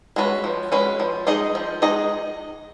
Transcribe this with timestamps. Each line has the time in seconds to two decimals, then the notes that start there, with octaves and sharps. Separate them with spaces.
0.16 G#3 C#4 F#4 B4
0.44 F3
0.72 G#3 C#4 F#4 B4
1.00 F3
1.27 G#3 D#4 G#4 D#5
1.55 F3
1.82 G#3 D#4 G#4 D#5